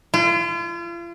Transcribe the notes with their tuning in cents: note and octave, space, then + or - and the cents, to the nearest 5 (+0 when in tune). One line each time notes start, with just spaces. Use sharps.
F4 -40